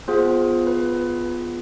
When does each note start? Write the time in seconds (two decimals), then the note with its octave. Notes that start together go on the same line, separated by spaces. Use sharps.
0.08 B3 F4 G#4 C5
0.67 B4